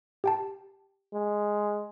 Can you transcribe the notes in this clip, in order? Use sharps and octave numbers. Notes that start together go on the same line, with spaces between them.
G4 G5 A5
G#3